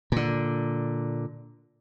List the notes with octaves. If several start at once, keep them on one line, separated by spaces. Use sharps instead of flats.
A#2 D3